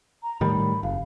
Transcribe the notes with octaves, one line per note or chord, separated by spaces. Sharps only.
A#5
A2 D#3 G3 B5
F#1 F5